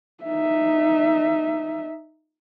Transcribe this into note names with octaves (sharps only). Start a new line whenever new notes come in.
D#4 E5